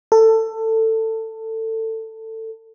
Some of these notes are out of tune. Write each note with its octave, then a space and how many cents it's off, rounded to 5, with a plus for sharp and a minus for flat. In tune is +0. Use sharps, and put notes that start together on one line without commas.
A4 +20